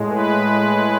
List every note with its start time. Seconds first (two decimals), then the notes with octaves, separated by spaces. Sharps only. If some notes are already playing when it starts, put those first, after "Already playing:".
Already playing: A2 G#3
0.09 B4